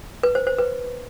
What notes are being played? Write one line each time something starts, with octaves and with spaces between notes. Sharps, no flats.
B4
C5
C5
B4